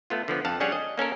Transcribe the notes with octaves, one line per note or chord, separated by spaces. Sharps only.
A3 B3 F4
D3 F3 B3
F2 F5 F#5 A5
G3 C#4 D4 G#4 C#5 F#5
D#5
A#3 C#4 A4 A#4